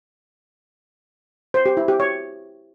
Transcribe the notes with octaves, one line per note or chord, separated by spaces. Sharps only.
C5
G4
E4
G4
C#5